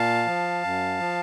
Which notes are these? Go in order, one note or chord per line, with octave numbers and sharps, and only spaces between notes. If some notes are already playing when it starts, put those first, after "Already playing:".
Already playing: A#2 F5 A5
F3
F#2
F3